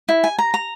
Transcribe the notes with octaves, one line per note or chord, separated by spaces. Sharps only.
E4
G#5
A#5
A#5